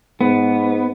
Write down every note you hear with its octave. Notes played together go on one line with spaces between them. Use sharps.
G#2 B3